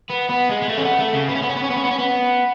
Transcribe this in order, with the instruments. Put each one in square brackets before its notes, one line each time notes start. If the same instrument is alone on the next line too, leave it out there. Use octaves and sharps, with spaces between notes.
[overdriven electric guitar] B3
B3
G#3
G#3
A3
C#4
B3
A3
C#3
B3
C#4
B3
C#4
B3
C#4
B3
C#4
B3
C#4
B3